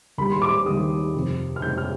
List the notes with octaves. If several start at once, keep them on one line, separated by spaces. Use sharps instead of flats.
D#2 D#3 G3 B5
C6
D6
D#2 D#3 G3 D#6
F2 C3 F3
F6
F2 C3 F3 G6
F6